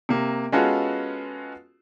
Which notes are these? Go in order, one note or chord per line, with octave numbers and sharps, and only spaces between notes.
C3 A#3
G#3 B3 C#4 F4 F#4 A4